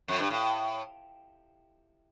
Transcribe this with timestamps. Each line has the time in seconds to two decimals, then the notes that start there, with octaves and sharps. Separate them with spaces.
0.08 F2
0.19 G2
0.30 A2